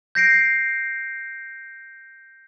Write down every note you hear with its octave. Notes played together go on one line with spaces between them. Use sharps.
G6 A#6 C7 D7